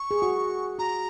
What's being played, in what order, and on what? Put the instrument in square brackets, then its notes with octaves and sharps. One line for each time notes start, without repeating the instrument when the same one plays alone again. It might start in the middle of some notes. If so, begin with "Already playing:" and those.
Already playing: [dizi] C#6
[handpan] G#4
F#4
[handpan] F#4 [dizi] A#5